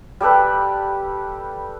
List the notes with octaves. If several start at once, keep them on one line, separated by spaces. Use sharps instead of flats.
G3 G4 A4 B4